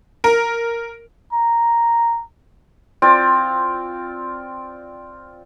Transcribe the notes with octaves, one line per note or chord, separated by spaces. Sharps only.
A#4
A#5
C4 F4 D5 G5